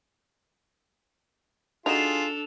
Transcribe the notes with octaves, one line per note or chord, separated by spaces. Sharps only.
D4 D#4 F4 F#4 G#4 A4 E7 F7